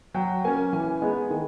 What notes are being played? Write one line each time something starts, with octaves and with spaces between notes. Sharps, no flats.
F#3 G5
A#3 C#4 G#5
E3 G#5
G#3 B3 D#4
D#3